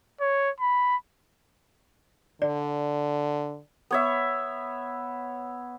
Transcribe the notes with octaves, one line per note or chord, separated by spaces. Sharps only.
C#5
B5
D3 D5
B3 C#5 E5